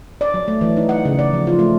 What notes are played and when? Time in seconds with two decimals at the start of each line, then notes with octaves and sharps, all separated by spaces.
0.21 D5
0.34 F#3
0.48 A3
0.61 E3
0.77 D#4
0.89 F#5
1.05 C#3
1.19 D5
1.33 F3
1.47 F4
1.59 A3